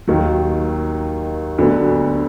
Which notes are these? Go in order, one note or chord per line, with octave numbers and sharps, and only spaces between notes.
D#2 D#3 F#3
D2 D3 F#3 B3